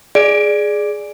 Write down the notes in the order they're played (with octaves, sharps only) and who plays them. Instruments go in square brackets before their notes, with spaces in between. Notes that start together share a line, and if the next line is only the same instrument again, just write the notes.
[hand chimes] G#4 D5 D7